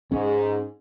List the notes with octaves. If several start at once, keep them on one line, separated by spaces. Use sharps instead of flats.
G#2 C#4